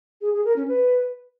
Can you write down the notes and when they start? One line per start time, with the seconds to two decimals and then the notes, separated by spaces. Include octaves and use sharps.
0.21 G#4
0.33 G#4
0.45 A#4
0.56 C#4
0.68 B4